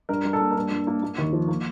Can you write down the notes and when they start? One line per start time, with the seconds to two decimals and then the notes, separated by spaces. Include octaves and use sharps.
0.09 G2 A#4
0.25 G2
0.33 A4
0.41 A#3
0.51 A#4
0.56 G2 A4
0.71 G2
0.87 A#3
1.03 A#3
1.18 D#2
1.33 F3
1.48 A#3